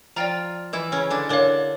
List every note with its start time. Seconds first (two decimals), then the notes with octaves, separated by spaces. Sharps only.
0.16 F3 F4 D5 G5 A#5
0.73 E3 E4
0.92 C#3 C#4
1.10 D3 D4
1.29 D3 D4 A#4 C#5 F5